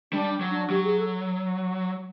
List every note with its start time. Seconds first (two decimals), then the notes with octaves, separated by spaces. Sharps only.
0.12 G3 D4
0.41 F#3
0.51 D4
0.70 F#3 G4
0.84 G#4
0.99 A4